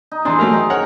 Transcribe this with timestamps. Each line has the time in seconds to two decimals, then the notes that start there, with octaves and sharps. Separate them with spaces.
0.12 D#4
0.25 E3 D4 D#4 G#4 C5
0.39 F#3 A3 A#4
0.53 D#3
0.70 C#4 A#4 C#5 F#5